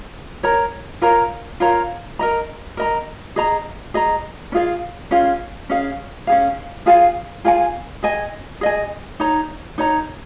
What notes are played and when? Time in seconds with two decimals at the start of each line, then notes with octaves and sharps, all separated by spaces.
0.43 A#4 C#5 A#5
1.01 F4 A#4 C#5 A#5
1.60 F4 A#4 C#5 A#5
2.19 A#4 D#5 A#5
2.77 A#4 D#5 A#5
3.36 G#4 D#5 A#5
3.94 G#4 D#5 A#5
4.52 C#4 F4 G#4 F5
5.11 C#4 F4 G#4 F5
5.69 C#4 G#4 F5
6.27 C#4 G#4 F5
6.86 F4 G#4 F5 G#5
7.44 F4 G#4 F5 G#5
8.03 G#4 D#5 G#5
8.61 G#4 D#5 G#5
9.20 D#4 C#5 A#5
9.78 D#4 C#5 A#5